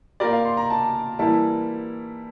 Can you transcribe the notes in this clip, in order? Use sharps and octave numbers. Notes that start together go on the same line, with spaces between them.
A#3 F4 G4 A#4 D5
F5
C6
A#5
A5
E3 G3 A#3 E4 A5